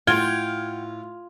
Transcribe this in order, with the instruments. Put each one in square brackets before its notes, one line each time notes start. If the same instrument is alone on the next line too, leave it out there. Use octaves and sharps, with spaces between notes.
[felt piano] A2 [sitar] F4 [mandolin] F#5 G5 [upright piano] F6 G#6 G7